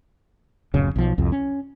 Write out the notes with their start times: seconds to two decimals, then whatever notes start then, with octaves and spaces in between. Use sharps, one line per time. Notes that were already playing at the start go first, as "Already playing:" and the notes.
0.74 D1 F#2 C#3
0.96 B1 F3
1.18 C2 F2
1.32 C#4